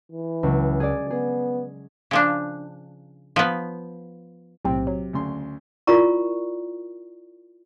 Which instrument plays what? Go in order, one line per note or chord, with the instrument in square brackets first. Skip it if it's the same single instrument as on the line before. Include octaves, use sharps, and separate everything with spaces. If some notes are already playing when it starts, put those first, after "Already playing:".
[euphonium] E3
[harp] C#2 F#3
G#4 D5
[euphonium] B3 [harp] G#4
[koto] C#3 F3 D4
F3 B3
[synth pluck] B1 A2 C4 [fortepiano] C3
[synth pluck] F#3
[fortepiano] D2 C#3 C6
[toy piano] E4 F4 A#4 D5 A#5 C#6